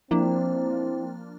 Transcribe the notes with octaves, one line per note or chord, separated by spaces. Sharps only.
F3 A#3 C4 D4 E4